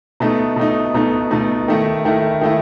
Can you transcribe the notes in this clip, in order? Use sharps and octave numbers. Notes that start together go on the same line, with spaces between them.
B2 A3 D#4
B2 A3 D#4
B2 A3 D#4
B2 A3 D#4
D#3 A3 E4
D#3 A3 E4
D#3 A3 E4